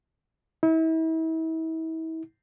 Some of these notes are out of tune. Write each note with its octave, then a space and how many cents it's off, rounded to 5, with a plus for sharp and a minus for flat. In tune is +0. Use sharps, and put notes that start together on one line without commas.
E4 -40